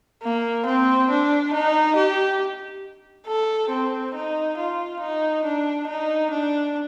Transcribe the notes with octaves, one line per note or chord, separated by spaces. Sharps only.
A#3
C4
D4
D#4
G4
A4
C4
D#4
F4
D#4
D4
D#4
D4